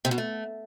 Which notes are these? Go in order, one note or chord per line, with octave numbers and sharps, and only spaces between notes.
C3
B2
A3